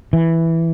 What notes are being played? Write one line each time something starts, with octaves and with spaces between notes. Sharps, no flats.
E3